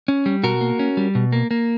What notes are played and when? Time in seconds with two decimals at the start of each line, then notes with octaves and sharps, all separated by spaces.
0.08 C#4
0.26 G3
0.43 B2 F#4 A#4
0.61 A#3
0.79 C#4
0.97 G3
1.15 B2
1.32 A#3
1.51 A#3